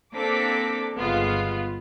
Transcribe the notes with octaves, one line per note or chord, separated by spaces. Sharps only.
A#3 C4 D4 A4 D6 B6
G1 C#3 G#3 B3 F4